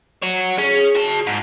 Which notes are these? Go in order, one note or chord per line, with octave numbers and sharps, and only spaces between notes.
F#4 C#5
C#4 G#4
F#4 A5
G#2